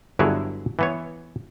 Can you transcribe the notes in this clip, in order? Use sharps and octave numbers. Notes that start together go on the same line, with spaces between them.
G1 D3 F#3 E4 G#4 C#5
E3 B3 C#5